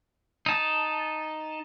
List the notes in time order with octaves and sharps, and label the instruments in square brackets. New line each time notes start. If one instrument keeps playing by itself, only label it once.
[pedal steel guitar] D#4 A5